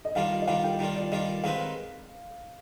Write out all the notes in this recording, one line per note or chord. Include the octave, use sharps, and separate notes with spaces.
D#5
D#3 G3 D4 F4 F5
D#5
D#3 G3 D4 F4 F5
G5
D#3 G3 D4 F4 G5
D5
D#3 G3 D4 F4 D#5
D#3 G#3 C4 D#4 B4 F5